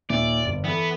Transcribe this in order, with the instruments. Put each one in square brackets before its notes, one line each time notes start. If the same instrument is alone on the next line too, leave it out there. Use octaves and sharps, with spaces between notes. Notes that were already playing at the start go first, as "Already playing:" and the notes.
[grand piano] D#2 A#2 E5 [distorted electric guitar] D5
[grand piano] G1
[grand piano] E3 A4 [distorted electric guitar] B3